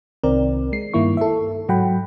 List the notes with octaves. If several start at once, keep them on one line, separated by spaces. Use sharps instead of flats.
C2 D#3 C4 A#4 D5
G#3 C7
G2 D#3 A#3 E4 C#6
A4 E5
G#2 F#3 F#5 G5 B5